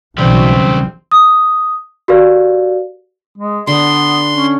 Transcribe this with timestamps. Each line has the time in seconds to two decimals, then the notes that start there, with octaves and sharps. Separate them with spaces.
0.18 B1 C#3 E3 G3 C4
1.12 D#6
2.08 F#4 G4 A#4 B4 D5 F5
3.38 G#3
3.67 D3 B3 C6
4.33 C#4